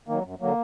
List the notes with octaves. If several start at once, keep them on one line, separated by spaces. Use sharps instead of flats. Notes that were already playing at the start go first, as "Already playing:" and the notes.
D#3 F#3 A#3
F#2
D3 F#3 A#3